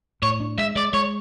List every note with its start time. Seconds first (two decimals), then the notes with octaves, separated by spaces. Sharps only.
0.22 A2 C#5
0.40 D4
0.58 G#3 E5
0.76 G#3 D5
0.93 G#3 C#5